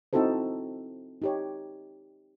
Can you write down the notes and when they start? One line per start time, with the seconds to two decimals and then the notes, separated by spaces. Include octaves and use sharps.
0.13 C4 D#4 E4 F#4 A4 C5
1.22 D#4 G4 C#5